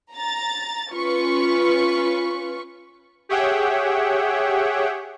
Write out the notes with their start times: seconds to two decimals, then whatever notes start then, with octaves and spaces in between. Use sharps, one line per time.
0.13 A#5 A6
0.92 C#4 F4 B4 C#6
3.29 G4 G#4 C#5 E5 F#5 G5